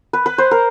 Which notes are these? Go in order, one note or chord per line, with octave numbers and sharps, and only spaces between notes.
B4
B4
C5
A#4